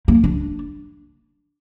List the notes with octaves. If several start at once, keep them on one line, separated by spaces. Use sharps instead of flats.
A#3
D4